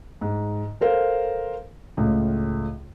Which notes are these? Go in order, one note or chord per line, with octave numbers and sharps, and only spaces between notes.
G#2
A4 A#4 C5 F5
C#2 A2